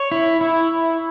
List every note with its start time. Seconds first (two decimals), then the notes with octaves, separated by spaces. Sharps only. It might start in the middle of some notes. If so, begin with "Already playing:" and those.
Already playing: C#5
0.12 E4
0.41 E4